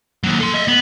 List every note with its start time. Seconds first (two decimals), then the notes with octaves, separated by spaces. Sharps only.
0.24 D#2 F#3
0.40 A4 C6
0.54 D#5 E5
0.67 B3